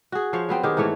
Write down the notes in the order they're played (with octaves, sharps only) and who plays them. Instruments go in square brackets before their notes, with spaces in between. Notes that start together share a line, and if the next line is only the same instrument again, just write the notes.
[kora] F#4 G#4
F3 C5 C#5
F#3 B3 C4 G5
D#3 G4 G#4
G#2 E3 A3 C#5